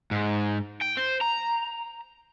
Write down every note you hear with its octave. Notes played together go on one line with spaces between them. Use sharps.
G#2
G5
C5
A#5